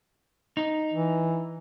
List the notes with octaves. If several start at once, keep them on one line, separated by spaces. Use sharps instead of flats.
D#4
E3